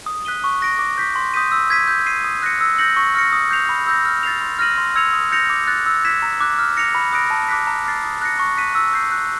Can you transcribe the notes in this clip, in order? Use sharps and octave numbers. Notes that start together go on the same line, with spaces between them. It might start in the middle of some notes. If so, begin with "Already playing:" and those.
D#6
F#6 B6 D#7 G7
C#6
F#6 A#6 D7
D6
G6 B6
C6
D#6 G6 B6 D#7
E6
G#6 B6 D#7
G6
C7 D#7
D#6
F#6 A#6 C#7
E6
G6 A#6 C#7 F#7
C#6
F6 A#6 C#7
D#6
G6 C7 F7
B5
E6 G6 A#6
F6
A6 C7 F7
C6
F6 A#6 D#7 F#7
C6
E6 G#6 C#7 F7
D#6
G6 A#6 C#7 F7
D6
F#6 A6
E6
G#6 B6 E7
A#5
D6 F#6
F6
A#6 C#7 F7
B5
D#6 F#6 A#6 D7
A5
D6 F#6 B6
A#5
D6 F6 A6 C7
D#6
F#6 A#6 C#7
C#6
F#6 B6 D#7
E6
G6 C7
F#6